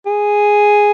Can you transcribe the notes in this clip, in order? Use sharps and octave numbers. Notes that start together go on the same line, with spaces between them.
G#4